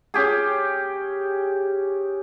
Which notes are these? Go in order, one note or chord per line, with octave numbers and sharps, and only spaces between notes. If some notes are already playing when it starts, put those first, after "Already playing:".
C#4 G4 G#4